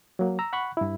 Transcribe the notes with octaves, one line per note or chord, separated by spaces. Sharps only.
F#3 A#3
A#5 E6
F#5 B5 C#6 F#6
G2 E4